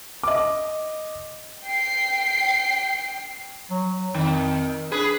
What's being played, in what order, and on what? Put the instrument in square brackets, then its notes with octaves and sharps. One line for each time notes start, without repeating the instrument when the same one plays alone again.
[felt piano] D#5 D6
[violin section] G5 C7
[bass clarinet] F#3
[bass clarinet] F2 [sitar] D#3
[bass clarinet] D4 [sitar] G#4 B4